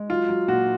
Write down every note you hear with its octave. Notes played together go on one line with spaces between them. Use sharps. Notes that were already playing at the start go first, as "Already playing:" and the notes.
Already playing: G#3
F#3 F4
F#3
A#2 F#4